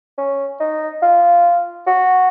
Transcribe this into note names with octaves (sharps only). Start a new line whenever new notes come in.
C#4
D#4
F4
F#4